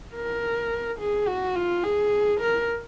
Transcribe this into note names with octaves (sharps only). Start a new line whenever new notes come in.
A#4
G#4
F#4
F4
G#4
A#4